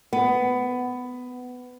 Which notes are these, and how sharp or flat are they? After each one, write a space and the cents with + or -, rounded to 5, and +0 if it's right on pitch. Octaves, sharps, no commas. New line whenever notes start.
B3 +15